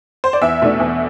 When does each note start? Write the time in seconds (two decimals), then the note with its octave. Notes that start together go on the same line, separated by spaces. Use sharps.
0.24 C5
0.33 D5
0.42 E2 E5
0.62 B2 A3 D4
0.80 E2